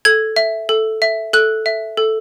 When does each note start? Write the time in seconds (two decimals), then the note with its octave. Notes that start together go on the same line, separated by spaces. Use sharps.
0.05 A4 G#6
0.36 E5
0.69 A4
1.02 E5
1.33 A4 F#6
1.66 E5
1.97 A4